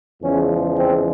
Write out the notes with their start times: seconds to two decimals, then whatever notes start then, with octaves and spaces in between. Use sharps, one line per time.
0.23 E2 C#3 F3 G#3 C#4
0.75 C4